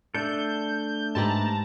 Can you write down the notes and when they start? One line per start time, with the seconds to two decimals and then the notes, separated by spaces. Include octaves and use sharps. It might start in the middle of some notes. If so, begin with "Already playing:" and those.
0.14 A3 D4 A4 G6
1.15 G#2 G4 B4 A5 A#5